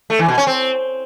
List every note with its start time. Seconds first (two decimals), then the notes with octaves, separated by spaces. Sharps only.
0.10 A3
0.19 E3
0.28 B2
0.38 C#4
0.47 C4